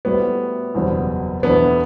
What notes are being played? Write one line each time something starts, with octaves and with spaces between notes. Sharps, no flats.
A2 G3 B3 C4 F#4
F#1 E2 B2 G3 C4
E2 B2 A3 B3 D4